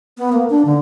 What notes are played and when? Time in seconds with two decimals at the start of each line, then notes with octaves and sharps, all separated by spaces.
0.18 B3
0.33 A#3
0.50 D4
0.65 D3